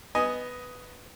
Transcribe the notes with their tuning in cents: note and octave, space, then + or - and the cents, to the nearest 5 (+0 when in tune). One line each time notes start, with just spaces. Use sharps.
B3 +5 D#5 +5 G#5 +0